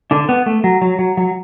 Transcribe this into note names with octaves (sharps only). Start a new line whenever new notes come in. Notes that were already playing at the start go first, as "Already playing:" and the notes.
D3 D4
B3
A3
F#3
F#3
F#3
F#3